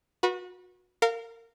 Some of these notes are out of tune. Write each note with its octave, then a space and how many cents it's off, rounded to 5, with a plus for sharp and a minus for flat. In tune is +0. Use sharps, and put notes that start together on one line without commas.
F#4 -30 B4 -30
A#4 -25 F5 +0